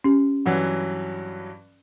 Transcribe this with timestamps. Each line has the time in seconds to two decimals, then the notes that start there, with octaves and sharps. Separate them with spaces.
0.04 C#4 G4
0.46 G2 E3 F#3 F#5